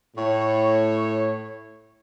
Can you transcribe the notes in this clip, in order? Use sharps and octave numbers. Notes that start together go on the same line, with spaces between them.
A2 C#5